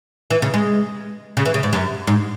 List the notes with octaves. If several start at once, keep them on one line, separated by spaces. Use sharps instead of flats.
E3
C#3
G#3
C#3
E3
C#3
G#2
F#2
G#2